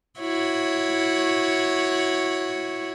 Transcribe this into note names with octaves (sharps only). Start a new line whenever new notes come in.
E4 F#4 C#5